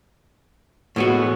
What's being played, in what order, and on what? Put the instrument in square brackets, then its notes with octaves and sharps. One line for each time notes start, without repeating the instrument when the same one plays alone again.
[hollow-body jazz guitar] A2 G#3 B3 F#4